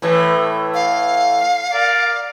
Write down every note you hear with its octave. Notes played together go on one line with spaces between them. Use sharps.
A2 E3 A3
F5
A#4 D5